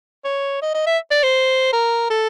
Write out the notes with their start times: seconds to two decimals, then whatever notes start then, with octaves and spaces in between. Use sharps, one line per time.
0.24 C#5
0.62 D#5
0.74 D#5
0.87 E5
1.11 D5
1.23 C5
1.73 A#4
2.10 A4